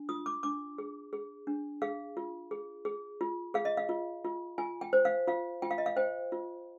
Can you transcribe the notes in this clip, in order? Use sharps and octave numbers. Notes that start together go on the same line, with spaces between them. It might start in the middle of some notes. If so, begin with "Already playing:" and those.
Already playing: D4
F4 D#6
D6
D4 D6
G#4
G#4
D4
G#4 F5
F4
G#4
G#4
F4
G#4 F5
D#5
F5
F4
F4
F4 G#5
G5
C5
F5
F4 F5
F4 G5
F5
D#5
F5
C5 G5
F4